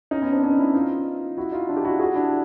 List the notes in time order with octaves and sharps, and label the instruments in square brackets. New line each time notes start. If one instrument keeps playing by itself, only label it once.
[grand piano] C#4 D#4
B3 C#4
C4 D4
C#4 D#4
D4 E4
D#4 F4
E4 F#4
D#4 F4
D4 E4
G4
E4 F#4
F#4 G#4
D4 E4